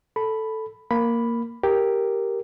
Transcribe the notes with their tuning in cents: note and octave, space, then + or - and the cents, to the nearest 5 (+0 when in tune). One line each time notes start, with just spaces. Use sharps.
A4 +0 B5 +0
A#3 -5 B5 +0
G4 +0 A#4 +0